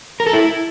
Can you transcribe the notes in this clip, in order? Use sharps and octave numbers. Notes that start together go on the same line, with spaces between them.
A#4
A4
E4